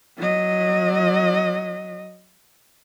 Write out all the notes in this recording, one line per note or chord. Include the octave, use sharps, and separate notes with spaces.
F#3 D#5